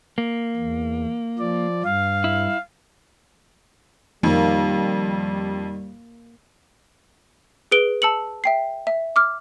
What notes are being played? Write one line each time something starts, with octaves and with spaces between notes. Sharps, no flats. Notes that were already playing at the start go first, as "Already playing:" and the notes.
A#3
E2
F3 D5
G2 F5
E4
F2 D#3 G3 A#3
G#4 B4 D7 G7
A5 E6 C#7 F#7
E5 G5 C7
E5
D6 F6